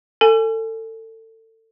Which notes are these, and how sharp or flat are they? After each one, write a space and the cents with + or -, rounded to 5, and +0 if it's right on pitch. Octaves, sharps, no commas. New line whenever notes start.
A4 +30 G#5 +10